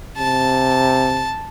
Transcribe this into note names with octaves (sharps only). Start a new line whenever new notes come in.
C3 A5